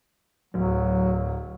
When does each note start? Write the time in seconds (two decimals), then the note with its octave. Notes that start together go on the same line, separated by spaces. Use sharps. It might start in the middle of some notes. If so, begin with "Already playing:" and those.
0.54 D1 F#3